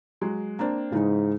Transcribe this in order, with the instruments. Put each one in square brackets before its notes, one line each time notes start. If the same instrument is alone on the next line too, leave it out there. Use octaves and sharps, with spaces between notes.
[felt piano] F#3 G#3
A#3 C4 D4
[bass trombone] G#2 [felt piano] C#3 E3 D#4